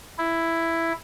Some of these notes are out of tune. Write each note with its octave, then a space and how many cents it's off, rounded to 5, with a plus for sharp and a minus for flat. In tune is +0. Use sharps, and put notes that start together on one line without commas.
E4 +5